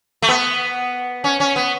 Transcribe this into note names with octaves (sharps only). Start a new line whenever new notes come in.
A3
B3
C#4
C#4
B3